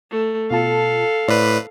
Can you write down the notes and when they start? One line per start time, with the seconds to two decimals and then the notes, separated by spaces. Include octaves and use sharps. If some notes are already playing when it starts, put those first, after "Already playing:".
0.11 A3
0.51 B2 F4 A4 F5 A5
1.28 A2 B4 C5 D5